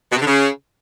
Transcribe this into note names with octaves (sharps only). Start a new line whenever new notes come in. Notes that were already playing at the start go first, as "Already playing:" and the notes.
B2
C3
D3
C#3